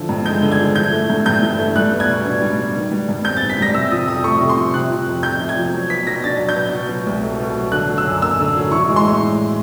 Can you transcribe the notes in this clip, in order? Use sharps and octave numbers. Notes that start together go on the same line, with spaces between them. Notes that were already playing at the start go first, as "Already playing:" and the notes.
Already playing: D3 E3 F3
G2
G#3 G6
D3
G#6
F3
E3 G6
A3
G2
G2 G6
E3
A3
G3 F#6
B3
G#6
B2
D4
G3
B3
D#3
G3
G2
C4 G6
A6
D#3
B6
G3 A#6
C3 E6
F3 D#6
F2 D#6
A3 C#6
C3
C6
F3
C3 F#6
F3
F2
F2 G6
C3
G#6
F3
F#3
B3 B6
B2 A#6
D4 A6
F#3
G6
B3
B2
F#3
C2
A3
B2
F#3
D3 F#6
F#3
E6
F#2
A#3 E6
D3
F#3
E3 C#6
G#3
C6
A2